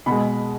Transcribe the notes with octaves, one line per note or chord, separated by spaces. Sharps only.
B2 G#3 B5